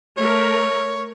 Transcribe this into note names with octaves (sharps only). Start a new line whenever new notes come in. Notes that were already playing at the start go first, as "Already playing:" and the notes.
A3 A#4 C#5